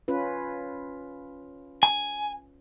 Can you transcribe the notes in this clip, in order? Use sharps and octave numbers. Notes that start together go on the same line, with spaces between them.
C#4 F4 B4
G#5